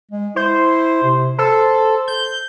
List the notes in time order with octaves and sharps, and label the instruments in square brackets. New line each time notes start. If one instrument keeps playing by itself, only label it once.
[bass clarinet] G#3
[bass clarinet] E4 [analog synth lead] C5
[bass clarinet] C3
[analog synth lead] A4 [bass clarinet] C5
[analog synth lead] G6